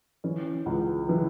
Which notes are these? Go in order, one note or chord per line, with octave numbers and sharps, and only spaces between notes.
E3 C#4
C#2
E3